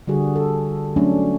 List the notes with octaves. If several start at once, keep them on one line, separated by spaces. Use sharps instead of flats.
D3 G3 F#4 G#4
A4
F#3 A3 C#4 D4